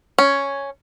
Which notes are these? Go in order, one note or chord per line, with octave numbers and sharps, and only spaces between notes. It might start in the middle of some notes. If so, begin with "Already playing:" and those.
C#4